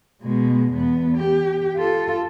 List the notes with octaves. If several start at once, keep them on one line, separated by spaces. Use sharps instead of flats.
B2 G#3
E2 B3
G4
F4 A4